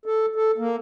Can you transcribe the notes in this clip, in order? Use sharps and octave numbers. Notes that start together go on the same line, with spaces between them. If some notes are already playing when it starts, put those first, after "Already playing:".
A4
A4
A#3